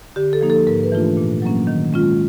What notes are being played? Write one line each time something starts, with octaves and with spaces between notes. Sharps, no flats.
D3 G4
A4
F3 A#3 D#4
A4
G#2 A#4
B4
E3 A3 D4 F4
A#2
F#3 A#3 C#4
D#3
G#3 C#4 F4